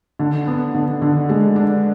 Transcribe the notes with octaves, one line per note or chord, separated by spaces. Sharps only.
D3
B3
D3
D3
G#3
D4